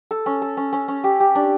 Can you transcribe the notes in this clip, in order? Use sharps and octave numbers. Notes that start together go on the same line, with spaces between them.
A4
C#4
A4
C#4
C#4
C#4
G4
G4
D4